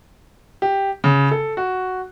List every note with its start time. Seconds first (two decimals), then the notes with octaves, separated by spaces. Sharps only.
0.62 G4
1.04 C#3
1.31 A4
1.57 F#4